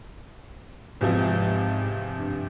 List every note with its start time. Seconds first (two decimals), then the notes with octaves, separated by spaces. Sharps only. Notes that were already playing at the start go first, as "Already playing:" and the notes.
1.01 E2 G#2 C3 F3
2.19 G2